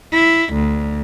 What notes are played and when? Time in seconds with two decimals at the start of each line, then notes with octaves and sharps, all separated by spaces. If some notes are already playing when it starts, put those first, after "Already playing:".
0.14 E4
0.54 D2